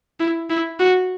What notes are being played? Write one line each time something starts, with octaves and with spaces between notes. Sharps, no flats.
E4
E4
F#4